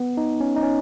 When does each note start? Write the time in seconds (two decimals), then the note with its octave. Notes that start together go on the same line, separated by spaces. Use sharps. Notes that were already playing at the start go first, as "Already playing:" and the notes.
Already playing: B3
0.17 D#4
0.40 C#4
0.56 D#4
0.63 C#4